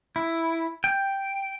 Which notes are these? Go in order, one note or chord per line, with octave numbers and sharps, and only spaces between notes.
E4
G5